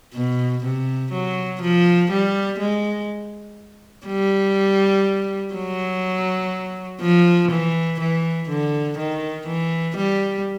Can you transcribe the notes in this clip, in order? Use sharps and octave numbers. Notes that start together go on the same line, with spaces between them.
B2
C3
F#3
F3
G3
G#3
G3
F#3
F3
E3
E3
D3
D#3
E3
G3